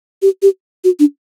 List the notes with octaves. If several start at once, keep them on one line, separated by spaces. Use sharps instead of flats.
G4
G4
F#4
D4